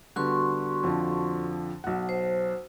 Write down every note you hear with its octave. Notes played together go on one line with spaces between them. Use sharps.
D3 G3 B3 F#4 C6 C#6
F2 D3 F3
B1 F#5
C5